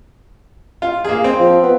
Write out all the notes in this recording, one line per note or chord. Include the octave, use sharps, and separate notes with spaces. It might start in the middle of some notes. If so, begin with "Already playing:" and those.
F4
A#3 G#4
C4
F3
B3